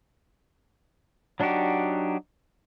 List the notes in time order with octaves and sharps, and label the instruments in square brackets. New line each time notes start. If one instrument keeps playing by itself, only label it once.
[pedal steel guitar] F#3 D4 D#4 F#4 G4